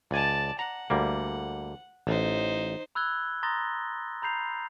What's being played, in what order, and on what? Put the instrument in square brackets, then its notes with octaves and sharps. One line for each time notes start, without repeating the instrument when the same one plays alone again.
[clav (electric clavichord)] C#2 G#5 [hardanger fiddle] D5 A5
[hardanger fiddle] F#5 [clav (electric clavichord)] A#5
[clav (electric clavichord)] D2 G3 A#3
[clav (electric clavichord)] A1 [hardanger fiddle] D#4 C5
[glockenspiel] B5 E6 F#6 G#6 G7
A#5 C6 D#6 A6 A#6 G7
A#5 B5 G6 C7 F7